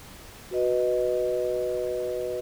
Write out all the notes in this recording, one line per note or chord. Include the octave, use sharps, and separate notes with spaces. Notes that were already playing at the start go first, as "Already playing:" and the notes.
F#4 B4 D#5